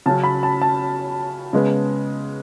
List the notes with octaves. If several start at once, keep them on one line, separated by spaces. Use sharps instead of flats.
C#3 F#3 C#4 A5
B5
A5
A5
C#3 G#3 B3